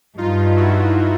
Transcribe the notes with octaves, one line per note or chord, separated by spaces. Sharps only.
G2 D#4 F4
E4 F#4